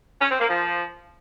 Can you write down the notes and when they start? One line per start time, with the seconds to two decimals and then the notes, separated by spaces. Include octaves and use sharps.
0.20 C#4
0.29 C4
0.39 A#3
0.48 F3